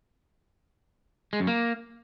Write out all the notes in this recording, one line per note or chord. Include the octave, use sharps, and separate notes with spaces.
G#3
F#2
A#3